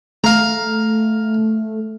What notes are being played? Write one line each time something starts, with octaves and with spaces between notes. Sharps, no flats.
A3 F5 A#5